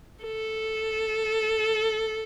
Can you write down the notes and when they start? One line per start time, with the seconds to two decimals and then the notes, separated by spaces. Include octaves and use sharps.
0.24 A4